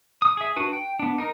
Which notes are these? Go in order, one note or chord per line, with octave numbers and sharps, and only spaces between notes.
D#6
G#4 E5
D4 F#4 B4
G5
B3 D4
D#4 A#4